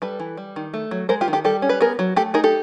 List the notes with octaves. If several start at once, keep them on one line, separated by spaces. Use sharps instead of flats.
G3 A4 B4
E3
G3
D#3
A3
F#3
G#3 A#4 C5
F4 G4
D#3
G4 A4
G3 G4 A4
C#4
B4
B3 G#4 A#4
F#3
A3 G4 A4
D#4 G#4 A#4
G4 A4